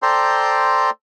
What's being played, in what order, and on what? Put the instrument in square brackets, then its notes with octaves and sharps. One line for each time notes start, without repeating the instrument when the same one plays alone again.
[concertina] A4 C5 D5 G5 A#5 C6